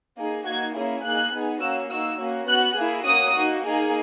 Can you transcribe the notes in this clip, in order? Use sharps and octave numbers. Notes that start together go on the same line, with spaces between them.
A#3 D#4 G#4
A#3 D#4 F#4 G#6
A#3 C#4 E4 G#4
A#3 D#4 G#4 F#6
B3 D#4 G#4
A#3 C#4 F#4 E6
A#3 D#4 F#4 E6
A#3 C#4 F#4
B3 F#4 F#6
A#3 E4 G#4
A#3 C#4 F#4 D#6
A#3 D#4 F#4
A#3 D#4 G#4